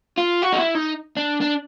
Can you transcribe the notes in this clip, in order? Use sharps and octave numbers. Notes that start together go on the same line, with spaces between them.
F4
F#4
D#4
E4
D#4
D4
D4